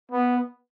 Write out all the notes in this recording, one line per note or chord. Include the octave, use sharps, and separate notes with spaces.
B3